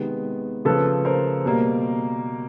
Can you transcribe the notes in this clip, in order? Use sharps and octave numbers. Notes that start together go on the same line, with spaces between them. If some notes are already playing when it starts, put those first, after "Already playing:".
Already playing: C3 D#3 G#3 B3
C#3 F3 A3 A4 B4
A#4 C5
B2 G3 A#3